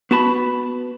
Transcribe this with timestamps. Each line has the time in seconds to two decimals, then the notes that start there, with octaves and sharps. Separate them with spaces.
0.11 B3 F#4 A5 B5